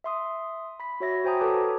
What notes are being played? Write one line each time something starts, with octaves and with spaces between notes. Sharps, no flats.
E5 C6 D#6
B5 B6
F#4 C#5 E5 A#6
F#4 C5 G5 G#5 A#5 D#6
A4 B4 C#5 A5 D6 D#6